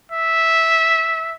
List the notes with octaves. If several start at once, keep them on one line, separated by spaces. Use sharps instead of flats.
E5